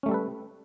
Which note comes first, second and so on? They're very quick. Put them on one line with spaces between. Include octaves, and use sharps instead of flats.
C#4 A3 G3 A4 B4